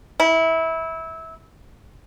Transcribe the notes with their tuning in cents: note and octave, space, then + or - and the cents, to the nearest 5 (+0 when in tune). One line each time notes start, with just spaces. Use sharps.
E4 -20